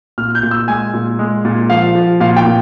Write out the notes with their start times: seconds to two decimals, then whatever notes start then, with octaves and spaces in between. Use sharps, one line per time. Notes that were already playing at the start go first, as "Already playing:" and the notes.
0.18 A#2 F6
0.35 G6
0.43 A#2
0.51 E6
0.68 G#3 G#5
0.94 A#2
1.19 G#3
1.45 A#2
1.70 F3 F5
1.95 F3
2.20 A#2 F5
2.37 G5
2.46 A#2